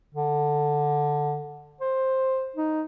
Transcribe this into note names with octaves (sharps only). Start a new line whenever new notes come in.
D3
C5
D#4